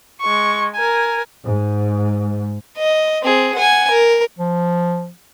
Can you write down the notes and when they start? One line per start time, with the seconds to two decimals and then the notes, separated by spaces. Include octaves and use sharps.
0.21 G#3 C#6
0.75 A#4 G#5
1.46 G#2
2.78 D#5
3.23 C4 G#4
3.55 F#5 G#5
3.90 A#4
4.39 F3